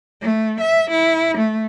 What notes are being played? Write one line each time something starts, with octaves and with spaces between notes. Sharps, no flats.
A3
E5
E4
A3